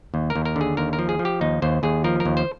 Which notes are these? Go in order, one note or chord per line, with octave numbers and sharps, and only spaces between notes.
D#2
A#4
D#2
A#4
D3 G#4
D#2 A#4
A#4
F3
G#4
F3
G4
D#2 D#4
D#2 C5
D#2 G#4
F3 A#4
A#4
D#2
C5